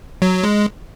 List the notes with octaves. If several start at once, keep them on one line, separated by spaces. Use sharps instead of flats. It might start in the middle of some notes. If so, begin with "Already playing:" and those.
F#3
G#3